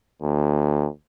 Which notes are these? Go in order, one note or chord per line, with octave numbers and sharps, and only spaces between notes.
D2